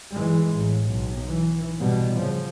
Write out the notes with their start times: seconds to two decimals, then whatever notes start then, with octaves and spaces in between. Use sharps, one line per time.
0.12 E3 G#3
0.57 A1
0.89 B1
1.27 E3
1.80 B2 G3
2.16 C#3 F3